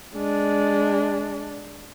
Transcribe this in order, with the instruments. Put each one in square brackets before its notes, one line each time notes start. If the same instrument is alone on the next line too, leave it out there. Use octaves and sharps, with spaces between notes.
[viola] G#3 D4